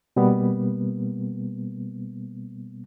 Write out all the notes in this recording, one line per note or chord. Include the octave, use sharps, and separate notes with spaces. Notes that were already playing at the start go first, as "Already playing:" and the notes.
B2 G3 A#3 B3